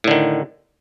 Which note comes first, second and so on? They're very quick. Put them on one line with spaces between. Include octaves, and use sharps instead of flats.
A2 D3 D#3